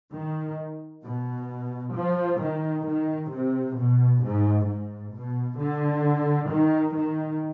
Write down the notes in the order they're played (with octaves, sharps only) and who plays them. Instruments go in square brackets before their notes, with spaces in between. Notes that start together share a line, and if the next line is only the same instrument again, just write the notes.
[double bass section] D#3
B2
F3
D#3
D#3
C3
B2
G#2
G#2
B2
D3
D#3
D#3